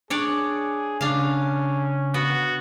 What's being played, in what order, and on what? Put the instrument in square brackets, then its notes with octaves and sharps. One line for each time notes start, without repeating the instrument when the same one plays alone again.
[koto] D4 C#5 D5 [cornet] G#4
[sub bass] C#3 [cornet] C#4 [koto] D4 F5
[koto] B3 [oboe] F#4